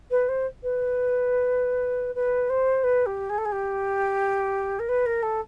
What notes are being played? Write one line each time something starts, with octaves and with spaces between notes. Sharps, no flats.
B4
C5
B4
B4
C5
B4
G4
G#4
A4
G#4
G4
A#4
B4
A#4
A4